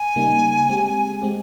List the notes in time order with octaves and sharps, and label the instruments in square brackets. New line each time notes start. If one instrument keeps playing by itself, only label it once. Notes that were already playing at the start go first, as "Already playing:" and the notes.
Already playing: [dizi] G#5
[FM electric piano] C#3 G3 A#3 D#4
G#3 C4 G4
G#3 C4 G4